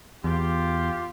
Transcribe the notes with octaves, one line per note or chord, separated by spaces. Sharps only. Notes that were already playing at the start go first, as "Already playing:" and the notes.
E2 F4 G4